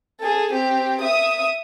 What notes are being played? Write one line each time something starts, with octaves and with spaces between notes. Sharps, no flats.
G#4 A4
C4 G4
E5 D#6